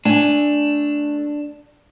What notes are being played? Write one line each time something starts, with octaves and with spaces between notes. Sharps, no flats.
A3 D4 G#5